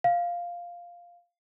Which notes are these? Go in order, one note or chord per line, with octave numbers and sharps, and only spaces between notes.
F5